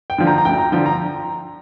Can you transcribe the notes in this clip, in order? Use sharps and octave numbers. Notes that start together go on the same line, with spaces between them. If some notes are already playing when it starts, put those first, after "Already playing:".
G5
D3 F3
A#5
A#5
D2 G5
A#5
D3 F3 G5
A#5